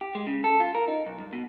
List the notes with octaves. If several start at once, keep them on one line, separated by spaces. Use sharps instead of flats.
G4
G#3
C#3
A4
F4
A#4
D#4
B1
G2
B2